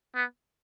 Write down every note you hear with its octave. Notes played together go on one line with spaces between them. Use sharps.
B3